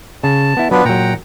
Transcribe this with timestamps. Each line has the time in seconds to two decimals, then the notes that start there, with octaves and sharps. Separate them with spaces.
0.23 C#3 A5
0.57 B3 E4
0.71 F#3 B3 D4 F4 B4
0.85 A#2 F#3 F#5 G5 A#5